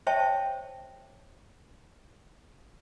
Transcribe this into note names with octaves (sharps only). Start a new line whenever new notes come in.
C5 C#5 E5 G5 A5 C#6